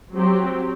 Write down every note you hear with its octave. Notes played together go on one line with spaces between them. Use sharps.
F#3 C4 G4